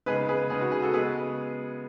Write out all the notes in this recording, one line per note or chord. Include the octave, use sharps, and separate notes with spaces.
C#3 G#3 B3 D#4 G#4 B4
G#4 B4
C#3 G#3 B3 D#4 G#4
F#4
G#4
F#4 A4
C#3 G#3 B3 G#4 B4